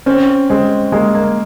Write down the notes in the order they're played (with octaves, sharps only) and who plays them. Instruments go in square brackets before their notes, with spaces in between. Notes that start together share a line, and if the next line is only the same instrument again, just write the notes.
[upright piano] C4 [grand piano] C#4
[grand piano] G#3 [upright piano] C4
[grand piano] G#3 [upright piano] A#3
[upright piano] A#3